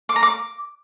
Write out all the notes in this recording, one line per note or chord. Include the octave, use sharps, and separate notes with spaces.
D6
A#5
D6